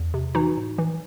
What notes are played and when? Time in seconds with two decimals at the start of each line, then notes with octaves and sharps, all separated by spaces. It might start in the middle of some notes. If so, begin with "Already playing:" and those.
Already playing: E2
0.14 C3
0.35 E3 D#4 F#4
0.57 A2
0.78 E3